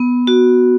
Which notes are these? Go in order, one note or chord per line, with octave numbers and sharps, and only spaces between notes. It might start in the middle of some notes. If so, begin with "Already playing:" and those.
Already playing: B3
F#4